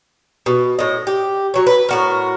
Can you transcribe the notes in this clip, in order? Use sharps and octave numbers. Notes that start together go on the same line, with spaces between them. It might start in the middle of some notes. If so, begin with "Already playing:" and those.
B2
A2 D#5
G4
F#3 C#5
B4
A2 F#4 A#4